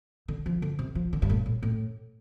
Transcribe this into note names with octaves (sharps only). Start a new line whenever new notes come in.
D3
F3
D3
C3
F3
D3
G2
A2
A2
A2